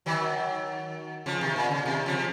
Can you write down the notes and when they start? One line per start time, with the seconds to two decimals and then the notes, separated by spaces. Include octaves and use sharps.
0.06 D#3 F#3
1.26 C#3 F3
1.41 C3 D#3
1.56 A#2
1.71 C#3
1.86 C3 D#3
2.06 C#3 F3
2.17 F3